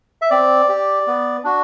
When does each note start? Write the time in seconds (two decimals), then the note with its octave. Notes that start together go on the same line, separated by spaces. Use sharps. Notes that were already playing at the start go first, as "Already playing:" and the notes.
0.22 E5
0.30 C4 D5
0.69 G4
1.07 B3
1.44 D4 F#4